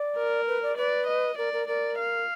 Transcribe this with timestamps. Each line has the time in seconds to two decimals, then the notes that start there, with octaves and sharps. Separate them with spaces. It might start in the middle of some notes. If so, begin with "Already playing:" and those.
Already playing: D5
0.17 A#4
0.47 B4
0.63 D5
0.77 B4 D5
1.07 D#5
1.38 A#4 D5
1.53 A#4
1.68 A#4 D5
1.98 F5